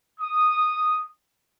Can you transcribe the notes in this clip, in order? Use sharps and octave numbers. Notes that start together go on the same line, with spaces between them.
D#6